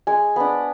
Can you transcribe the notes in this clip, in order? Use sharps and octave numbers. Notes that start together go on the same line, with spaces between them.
G#3 G#5
B3 D4